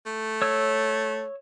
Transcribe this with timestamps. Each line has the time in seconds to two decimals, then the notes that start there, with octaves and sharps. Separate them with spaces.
0.06 A3
0.42 C#5 E6